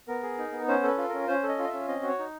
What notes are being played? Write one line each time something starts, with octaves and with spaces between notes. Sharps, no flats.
B3 A#4
G#4
D#4
B3
C#4 C5
A4 B4
F4
C#4 A#4
C#4 C5
A4
D#5
F4
D#5
E5
C#4
C4 D#5
F#4
C#5
D#4